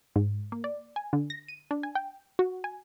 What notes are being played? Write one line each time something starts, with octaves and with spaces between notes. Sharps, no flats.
G#2
A#3
D5
G#5
D3
A#6
D#7
D4
G#5
G5
F#4
G#5